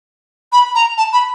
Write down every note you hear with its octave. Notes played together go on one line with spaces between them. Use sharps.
B5
A#5
A5
B5